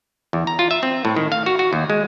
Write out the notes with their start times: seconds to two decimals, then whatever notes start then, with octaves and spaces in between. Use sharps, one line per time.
0.33 E2
0.47 A#5
0.59 F4
0.71 E5
0.83 C4
1.05 A2
1.17 D#3
1.32 F5
1.46 F#4
1.59 F#4
1.73 D#2
1.90 G#3